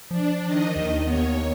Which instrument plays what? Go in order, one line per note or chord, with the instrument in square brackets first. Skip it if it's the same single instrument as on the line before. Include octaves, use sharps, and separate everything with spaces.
[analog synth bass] F3 [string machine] D4
[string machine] D#3 D#5
[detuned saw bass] D#2
[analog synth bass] B3 [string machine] C#5